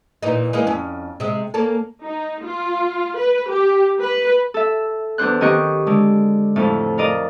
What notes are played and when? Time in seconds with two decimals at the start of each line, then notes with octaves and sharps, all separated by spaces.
0.23 A#2 E3 D#4
0.53 E3 G#3 A#3
0.67 F2 C#4
1.20 C3 G#3
1.54 A#3 C#4 A4
2.04 D#4
2.44 F4
3.18 B4
3.50 G4
4.00 B4
4.54 A4 E5
5.18 E2 D4 C5 F#6
5.41 D#3 C4 G4 D#5 C#6 F#6
5.86 D3 G#3
6.56 F2 A2
6.98 F4 A#4 D5 D#5